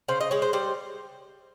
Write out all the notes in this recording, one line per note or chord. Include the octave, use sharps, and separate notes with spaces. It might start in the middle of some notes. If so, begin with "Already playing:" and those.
C#3 C5
D#5
G#3 C#5
C5
G3 C5